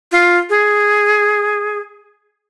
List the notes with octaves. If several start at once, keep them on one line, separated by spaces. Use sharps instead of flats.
F4
G#4